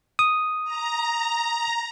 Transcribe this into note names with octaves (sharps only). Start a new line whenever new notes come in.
D#6
A#5